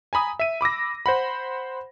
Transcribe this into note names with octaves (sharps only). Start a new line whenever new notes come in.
G#5 A#5 B5 D#6
E5 D#7
B5 D6 E6 A#6
C5 F#5 B5